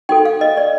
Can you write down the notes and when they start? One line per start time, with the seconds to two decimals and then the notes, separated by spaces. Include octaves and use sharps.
0.09 D#4 F#4 A4 G5
0.25 F5
0.41 D#5
0.57 D5